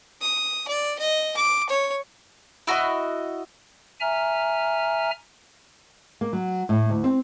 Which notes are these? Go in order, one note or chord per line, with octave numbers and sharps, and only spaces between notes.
D#6
D5
D#5
D6
C#5
E4 F#4 A4 D#5
E5 G#5 A#5 F6
A#3
F#3
A2
D2
C4